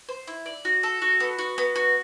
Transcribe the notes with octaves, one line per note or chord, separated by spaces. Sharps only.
C5
E4
D5
F#4
A4
F#4
B3
F#4
B3
F#4